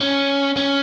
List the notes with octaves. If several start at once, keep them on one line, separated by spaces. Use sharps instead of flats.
C#4
C#4